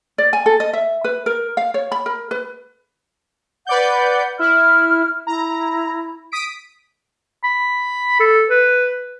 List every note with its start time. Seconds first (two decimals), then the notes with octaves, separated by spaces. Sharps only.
0.18 D5
0.33 G#5
0.46 A4
0.60 D#5
0.73 E5
1.04 B4
1.26 A#4
1.57 F5
1.74 C#5
1.92 B5
2.06 A#4
2.31 B4
3.67 B4 D5 F#5 G6
4.39 E4 F6
5.27 E4 A#5
6.32 D#6 B6 D7
7.44 B5
8.20 A4
8.50 B4